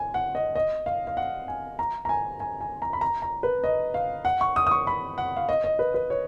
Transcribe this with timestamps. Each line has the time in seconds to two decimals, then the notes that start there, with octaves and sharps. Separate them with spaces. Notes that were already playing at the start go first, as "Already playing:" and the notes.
Already playing: G#5
0.14 F#5
0.35 D#5
0.55 D#5
0.86 F5
1.07 F5
1.17 F#5
1.48 G#5
1.79 A#5
2.05 A#5
2.09 G#5
2.40 G#5
2.61 G#5
2.82 A#5
2.93 B5
3.01 A#5
3.22 A#5
3.43 B4
3.64 D#5
3.94 F5
4.25 F#5
4.41 C#6
4.56 D#6
4.67 D#6
4.71 C#6
4.87 B5
5.18 F#5
5.36 F5
5.49 D#5
5.64 D#5
5.79 B4
5.94 B4
6.10 C#5